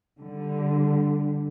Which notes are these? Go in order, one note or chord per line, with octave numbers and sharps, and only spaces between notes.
D3 G3